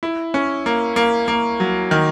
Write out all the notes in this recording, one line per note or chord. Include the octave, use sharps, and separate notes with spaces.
E4
C#4
A#3
A#3
A#3
F#3
D#3